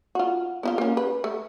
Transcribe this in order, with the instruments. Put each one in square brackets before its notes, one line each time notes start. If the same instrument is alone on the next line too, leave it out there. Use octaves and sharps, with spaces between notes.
[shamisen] F4 F#4
B3 E4 F4
A#3 C#4
B4
A3